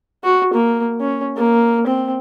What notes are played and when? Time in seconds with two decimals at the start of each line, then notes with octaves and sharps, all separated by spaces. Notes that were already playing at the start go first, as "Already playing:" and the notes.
0.24 F#4
0.54 A#3
1.00 C#4
1.37 A#3
1.87 C4